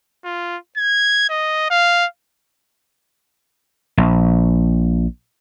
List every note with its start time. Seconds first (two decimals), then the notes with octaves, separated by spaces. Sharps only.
0.24 F4
0.77 G#6
1.29 D#5
1.70 F5
3.97 A#1